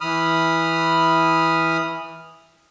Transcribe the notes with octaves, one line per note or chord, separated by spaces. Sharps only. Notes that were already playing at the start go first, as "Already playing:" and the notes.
E3 B5 D#6 F6